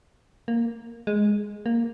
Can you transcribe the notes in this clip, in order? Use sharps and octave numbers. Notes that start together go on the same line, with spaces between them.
A#3
G#3
A#3